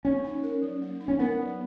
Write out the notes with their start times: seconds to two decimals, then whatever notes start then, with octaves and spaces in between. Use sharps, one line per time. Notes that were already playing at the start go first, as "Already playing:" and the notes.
0.05 A#3 C#4
0.24 D#4
0.43 A#4
0.62 F#3
0.82 A#3
1.00 D#4
1.08 C#4
1.19 B3 A#4
1.39 F#3